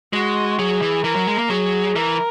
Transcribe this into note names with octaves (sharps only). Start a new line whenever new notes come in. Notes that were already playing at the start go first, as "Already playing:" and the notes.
G#3 F#4
F#3 G#4
E3
E3 A#4
F#3
G#3
A#3
F#3 G#4
E3 A#4